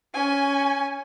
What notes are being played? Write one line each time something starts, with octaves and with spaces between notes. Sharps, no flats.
C#4 G#5